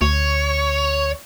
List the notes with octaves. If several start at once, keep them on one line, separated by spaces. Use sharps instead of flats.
D2 C#5